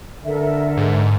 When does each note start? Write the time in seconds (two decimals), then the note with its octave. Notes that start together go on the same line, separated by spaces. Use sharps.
0.25 D3 A4 A#4 E5
0.77 G#2